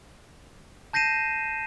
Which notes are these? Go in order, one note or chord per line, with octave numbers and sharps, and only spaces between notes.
A5 G6 A#6 C7 D#7 E7